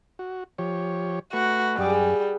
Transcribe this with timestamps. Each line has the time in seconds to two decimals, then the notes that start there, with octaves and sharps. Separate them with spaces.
0.19 F#4
0.58 F3 G4 C#5
1.33 A3 F#4 B4
1.78 F#2 G3 G#4 B4